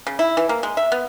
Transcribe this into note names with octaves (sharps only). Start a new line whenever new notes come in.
C#3
E4
E3
A#3
G#3
E5
B3